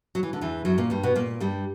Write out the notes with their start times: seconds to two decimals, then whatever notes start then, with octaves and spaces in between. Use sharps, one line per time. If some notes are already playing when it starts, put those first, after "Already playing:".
0.15 F#3
0.23 E3
0.33 D3
0.41 E2 E3
0.65 F#2 F#3
0.78 A#2 A#3
0.90 G2 G3
1.03 B2 B3
1.15 A#2 A#3
1.40 G2 G3